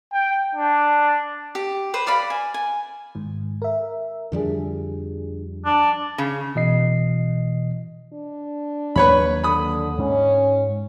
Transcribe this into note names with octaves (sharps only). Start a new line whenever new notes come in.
G5
D4
G4
B4 C5
B4 D5 F5 B5
G#5
G#5
G#2 D#3
A#4 E5
F2 D3 F3 G3 D4 G#4
D4
C#3
B2 E3 D#5 C7
D4
D#2 F#3 A#3 B4 C#5 B5
D3 B5 D#6
G#2 C#4